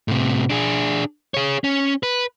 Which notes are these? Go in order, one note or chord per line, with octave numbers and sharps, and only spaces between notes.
A2 C3
D4 G#4
G#4 C#5
C#4
B4